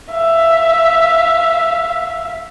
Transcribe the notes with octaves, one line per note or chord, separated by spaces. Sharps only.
E5 F5